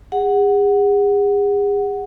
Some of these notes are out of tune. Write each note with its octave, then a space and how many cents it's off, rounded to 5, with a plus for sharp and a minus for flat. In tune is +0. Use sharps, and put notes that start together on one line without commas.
G#4 -40 F#5 +0